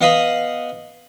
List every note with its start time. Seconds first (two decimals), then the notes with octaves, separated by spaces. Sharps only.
0.01 B3 D#5 F5 B5 D#6